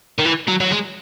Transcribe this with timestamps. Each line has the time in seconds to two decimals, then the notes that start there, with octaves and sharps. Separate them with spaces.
0.19 D#3
0.26 E3
0.48 F#3
0.61 F#3
0.71 G#3